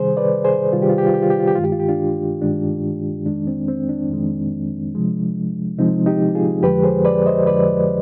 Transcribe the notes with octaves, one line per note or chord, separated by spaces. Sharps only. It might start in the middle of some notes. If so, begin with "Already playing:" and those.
Already playing: C3 D#3 G3 G#4 C5
B4 D5
G#4 C5
C3 D#3 G3 F4
G4
F4
G4
F4
G4
F4
G4
F4
G4
G2 D#3 G#3 F4
G4
F4
G4
D4 F4
G2 D#3 G#3 D4
F2 D#3 G#3 D4
C4
C4
D4
F2 D#3 G#3
C3 F3 G#3
C3 F3 G#3 C4 D#4
D#4 G4
F4 G#4
F2 D3 F3 G#3 G4 B4
G#4 C5
B4 D5
C5 D#5
F2 D3 F3 G#3 B4 D5